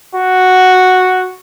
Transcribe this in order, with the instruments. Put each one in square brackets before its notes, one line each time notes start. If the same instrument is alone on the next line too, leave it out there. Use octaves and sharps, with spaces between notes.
[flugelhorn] F#4